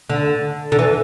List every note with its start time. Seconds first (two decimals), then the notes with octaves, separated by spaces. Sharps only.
0.10 D3
0.72 D3
0.79 E3